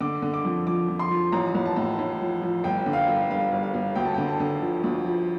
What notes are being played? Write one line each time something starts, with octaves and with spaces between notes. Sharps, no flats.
D3 D6
D3
D6
F2
F3 D6
F2
C6
F3
A1 A#5
A1
A5
A2
A2
F3
F3
G1 G5
D3
F5
G5
G1
G2 F5
G1
F5
G1
D2 G5
A5
D3 G5
A5
D3
F3
D2
F3